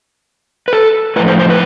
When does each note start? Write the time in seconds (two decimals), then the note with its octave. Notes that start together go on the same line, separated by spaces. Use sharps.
0.68 B4
0.73 A4
1.16 A2 B4
1.19 F3
1.28 C5
1.39 C5
1.50 B4